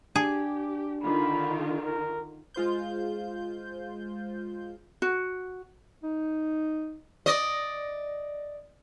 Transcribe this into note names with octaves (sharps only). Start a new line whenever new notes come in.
D4 G4 G#4
D3 D#3 F4 B5
A#4
G#3 F4 C5 G6
F#4
D#4
D5 D#5